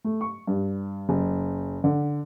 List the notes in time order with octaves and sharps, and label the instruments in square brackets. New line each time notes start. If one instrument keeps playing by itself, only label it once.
[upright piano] A3
C#6
G2
F#1
D3